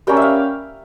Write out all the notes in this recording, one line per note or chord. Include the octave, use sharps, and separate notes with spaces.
G3 A#3 C#4 G5
E5 F5